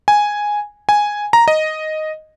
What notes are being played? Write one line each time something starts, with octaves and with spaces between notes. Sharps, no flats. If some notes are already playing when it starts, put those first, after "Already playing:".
G#5
G#5
A#5
D#5